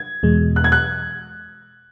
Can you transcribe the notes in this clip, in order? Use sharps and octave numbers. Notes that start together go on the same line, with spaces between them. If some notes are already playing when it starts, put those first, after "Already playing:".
Already playing: G#6
E2 B2 G#3
F#6
G#6
F#6